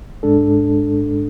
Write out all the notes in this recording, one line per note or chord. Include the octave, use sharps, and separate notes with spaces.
G#2 G#3 D4 A4